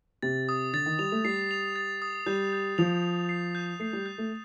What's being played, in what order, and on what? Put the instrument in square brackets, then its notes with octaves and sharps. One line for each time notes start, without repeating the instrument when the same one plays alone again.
[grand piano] C3 [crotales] A6
[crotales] D#6
[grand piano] D3 [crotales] A6
[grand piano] D#3
[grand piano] G3 [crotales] F7
[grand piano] A3
[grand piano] G3 [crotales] C7
[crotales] F7
A6
D#6
[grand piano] G3 [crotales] G6
[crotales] G6
[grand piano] F3 [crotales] F7
[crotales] F7
C7
G6
[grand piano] A3 [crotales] C7
[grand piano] G3
[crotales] G6
[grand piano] A3